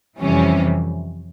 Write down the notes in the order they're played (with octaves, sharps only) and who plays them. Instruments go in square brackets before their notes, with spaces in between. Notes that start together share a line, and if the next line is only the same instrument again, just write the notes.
[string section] F2 C3 E3 G3 C#4